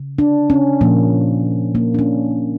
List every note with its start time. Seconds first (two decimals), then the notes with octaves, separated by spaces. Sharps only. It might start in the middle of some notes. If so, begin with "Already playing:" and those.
Already playing: C#3
0.19 D4
0.50 C#4
0.81 A#2 F3 A#3
1.75 A#3
1.94 D4
1.99 C#4